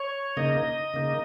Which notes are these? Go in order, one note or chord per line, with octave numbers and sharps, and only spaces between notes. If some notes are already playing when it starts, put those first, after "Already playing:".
Already playing: C#5
C#3 A#3 D#4 D#5
C#3 A#3 D#4